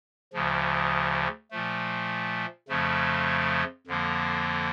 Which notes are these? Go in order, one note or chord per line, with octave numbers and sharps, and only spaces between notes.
D2 C#3 F3
A#2 F3 A3
F2 C#3 F3 A3
F2 D3 F3 A#3